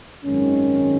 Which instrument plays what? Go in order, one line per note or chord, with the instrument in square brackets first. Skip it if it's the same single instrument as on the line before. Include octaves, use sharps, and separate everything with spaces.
[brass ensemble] G#1 F#2 D#3 G#3 C#4